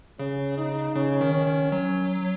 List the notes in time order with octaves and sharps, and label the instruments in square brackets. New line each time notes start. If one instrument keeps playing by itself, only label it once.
[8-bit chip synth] C#3 [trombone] C#4
[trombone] D#4
[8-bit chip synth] C#3 [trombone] C#4
[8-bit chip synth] D#3
[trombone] C#4
[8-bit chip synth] D#3
[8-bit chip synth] F#3 [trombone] C#4